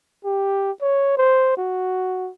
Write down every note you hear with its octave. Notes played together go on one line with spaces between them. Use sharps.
G4
C#5
C5
F#4